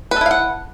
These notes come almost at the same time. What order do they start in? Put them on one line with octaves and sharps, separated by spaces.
B4 A4 E4 F5 F#5